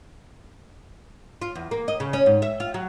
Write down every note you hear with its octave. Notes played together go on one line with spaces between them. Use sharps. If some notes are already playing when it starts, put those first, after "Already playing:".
F4
E2
A#3
D#5
C#3
C#4
G#2
E5
F4
F#3